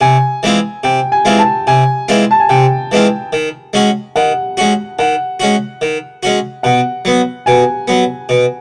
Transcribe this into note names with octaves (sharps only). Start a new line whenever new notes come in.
C3 G#5
E3 G#3 C4 F4
C3 G5
G#5
E3 G#3 C4 F4
A5
C3 G#5
E3 G#3 C4 F4
A5
G#5
C3 G5
E3 G#3 C4 F4
D#3
G#3 C#4 F#4
D#3 F#5
G#3 C#4 F#4
D#3 F#5
G#3 C#4 F#4
D#3
G#3 C#4 F#4
B2 F#5
F#3 B3
B2 G#5
F#3 B3
B2